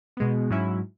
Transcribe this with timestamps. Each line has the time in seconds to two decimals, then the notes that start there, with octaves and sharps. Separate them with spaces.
0.17 B2 G#3 B3
0.50 G#2 F#3 C#4 E4